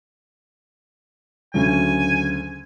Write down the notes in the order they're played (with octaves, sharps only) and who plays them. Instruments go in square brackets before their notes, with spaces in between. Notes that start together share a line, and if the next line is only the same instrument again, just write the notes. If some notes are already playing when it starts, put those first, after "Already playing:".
[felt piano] D2 C#3 F#3 [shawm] G#5